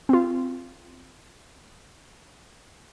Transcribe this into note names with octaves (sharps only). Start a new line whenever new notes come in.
C4 F4